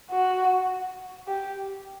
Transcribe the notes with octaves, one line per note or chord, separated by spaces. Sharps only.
F#4
G4